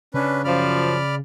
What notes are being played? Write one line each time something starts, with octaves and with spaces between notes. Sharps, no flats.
C#3 C#4 D4 B4
F#2 F3 D5 B5 F6